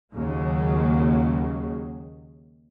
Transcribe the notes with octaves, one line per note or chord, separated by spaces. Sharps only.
D#2 C#3 F#3 G#3